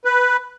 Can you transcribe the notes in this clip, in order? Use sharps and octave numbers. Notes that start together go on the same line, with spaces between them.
B4